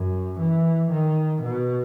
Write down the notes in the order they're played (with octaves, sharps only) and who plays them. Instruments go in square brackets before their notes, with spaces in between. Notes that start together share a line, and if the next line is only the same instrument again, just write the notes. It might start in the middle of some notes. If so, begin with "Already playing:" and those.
Already playing: [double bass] F#2
E3
D#3
B2